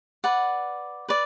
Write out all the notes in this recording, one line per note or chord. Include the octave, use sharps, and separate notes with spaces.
B4 D5 F#5
B4 D5